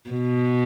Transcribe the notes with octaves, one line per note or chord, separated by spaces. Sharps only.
B2